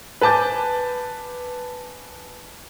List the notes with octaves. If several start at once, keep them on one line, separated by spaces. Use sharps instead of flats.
B4 G#5 A5 D6 G6